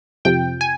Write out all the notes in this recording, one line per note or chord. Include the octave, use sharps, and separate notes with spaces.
F2 C3 F3 G5
G#5